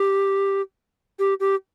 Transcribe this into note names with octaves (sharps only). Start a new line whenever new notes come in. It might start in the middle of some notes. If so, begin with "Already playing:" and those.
Already playing: G4
G4
G4